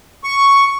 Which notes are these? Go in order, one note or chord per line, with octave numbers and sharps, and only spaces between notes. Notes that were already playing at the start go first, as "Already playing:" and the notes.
C#6